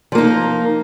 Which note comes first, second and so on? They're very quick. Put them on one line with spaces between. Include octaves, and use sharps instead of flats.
F3 A#3 D#4